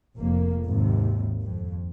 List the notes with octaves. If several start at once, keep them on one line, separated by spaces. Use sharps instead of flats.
F1 F2 A#3
G#1 D#2 C3
F2